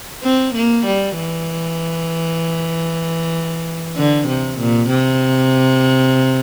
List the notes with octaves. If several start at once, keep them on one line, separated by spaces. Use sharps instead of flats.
C4
A#3
G3
E3
D3
C3
A#2
C3